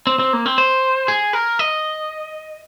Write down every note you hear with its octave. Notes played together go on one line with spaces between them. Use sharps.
C4
C4
A#3
C4
C5
G#4
A#4
D#5